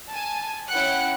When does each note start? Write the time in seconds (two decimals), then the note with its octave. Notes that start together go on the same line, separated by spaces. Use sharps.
0.11 G#5 A5
0.69 C#4 E4 F#5 G5 F#6 C#7